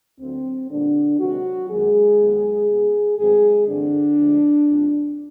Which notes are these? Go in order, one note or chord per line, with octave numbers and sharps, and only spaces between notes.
D2 D3 F#3 C4
A#2 D3 G3 A#3 D4
C3 D#3 F#3 G#3 C4 F#4
F#2 D#3 F#3 G#3 A#3 G#4
D#2 D#3 F#3 B3
B2 G#3 B3
G#2 D#3 F#3 G#3 A3 C4 G#4
G2 D3 E3 A3 C4 D4
D2 D3 F3 G#3
F2 C3 F3 G#3 C4